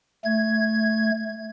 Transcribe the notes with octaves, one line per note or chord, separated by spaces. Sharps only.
A3 G#6